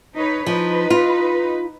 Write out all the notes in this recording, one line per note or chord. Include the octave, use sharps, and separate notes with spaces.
D#4 B4 C#5
F3 D#4 B4
F4